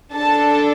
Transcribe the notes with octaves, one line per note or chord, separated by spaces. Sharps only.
D4 A4 A5